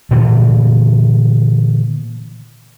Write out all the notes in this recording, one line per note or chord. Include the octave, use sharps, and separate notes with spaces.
A#2 D3 E3 A3